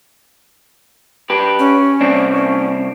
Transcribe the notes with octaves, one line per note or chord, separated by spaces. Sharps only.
G4 B4
C#4
C2 C4 D4